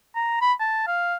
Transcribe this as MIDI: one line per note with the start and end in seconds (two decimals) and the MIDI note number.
0.16 0.40 82
0.41 0.53 83
0.60 0.86 81
0.87 1.15 77